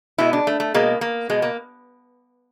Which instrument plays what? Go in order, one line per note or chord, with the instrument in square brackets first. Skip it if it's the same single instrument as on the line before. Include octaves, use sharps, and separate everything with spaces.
[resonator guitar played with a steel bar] B2 G#3 E4
D4
A3
A3
B2 G#3 A#3
A#3
B2 G#3
A#3